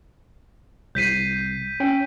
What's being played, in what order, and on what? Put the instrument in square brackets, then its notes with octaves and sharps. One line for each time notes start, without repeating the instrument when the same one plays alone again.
[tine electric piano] C2 C7 [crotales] G6 B6 D#7
[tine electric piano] C#4 G5